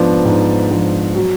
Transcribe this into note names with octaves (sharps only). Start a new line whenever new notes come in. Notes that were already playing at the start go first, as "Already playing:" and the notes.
Already playing: G#2 F3 B3 D4
G#2
F3 B3 D4
F#3